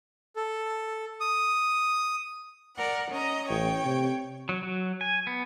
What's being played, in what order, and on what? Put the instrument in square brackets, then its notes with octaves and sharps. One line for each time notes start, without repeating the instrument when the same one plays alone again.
[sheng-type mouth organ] A4
D#6
[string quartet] A#4 D5 F#5
C#4 D#5 A#5
[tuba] A1 [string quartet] C#5 G5
[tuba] C3
[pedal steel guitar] F#3
F#3
G#5
B3